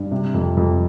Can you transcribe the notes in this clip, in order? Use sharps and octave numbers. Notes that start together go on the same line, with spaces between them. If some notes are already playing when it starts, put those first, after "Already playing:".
Already playing: G2
C3
F2
F2